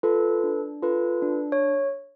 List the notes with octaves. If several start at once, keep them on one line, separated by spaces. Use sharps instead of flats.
F4 A4 B4
D4
F4 A4 B4
D4
C#5